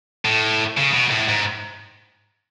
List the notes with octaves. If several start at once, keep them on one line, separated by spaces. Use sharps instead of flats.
A2
C#3
B2
A2
G#2